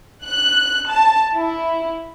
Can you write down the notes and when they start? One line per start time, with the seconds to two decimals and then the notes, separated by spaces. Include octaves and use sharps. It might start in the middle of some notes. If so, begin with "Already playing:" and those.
0.25 F#6
0.89 A5
1.34 E4